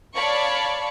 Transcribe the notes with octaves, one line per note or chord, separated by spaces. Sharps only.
C#5 D5 F5 A5 B5 C#6